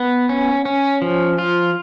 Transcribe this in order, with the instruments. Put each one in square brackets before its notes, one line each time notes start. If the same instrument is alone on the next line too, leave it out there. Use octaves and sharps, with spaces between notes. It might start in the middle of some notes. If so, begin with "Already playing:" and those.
Already playing: [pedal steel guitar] B3
C#4
C#4
F3
F4